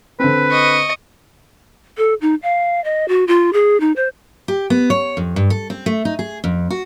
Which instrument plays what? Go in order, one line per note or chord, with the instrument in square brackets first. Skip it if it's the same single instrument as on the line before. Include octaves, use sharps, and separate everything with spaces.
[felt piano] D3 C4 [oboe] B4
[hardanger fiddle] D#5 C#6
[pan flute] A4
D#4
F5
D#5
F#4
F4
G#4
D#4
C5
[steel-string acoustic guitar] G4
B3
C#5
F2
G2
A4
C4
A3
D#4
G#4
F2
F#4